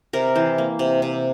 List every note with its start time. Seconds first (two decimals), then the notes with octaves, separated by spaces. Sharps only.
0.13 C3 A#4
0.36 E3 C5
0.58 A#3
0.79 C3
1.02 C3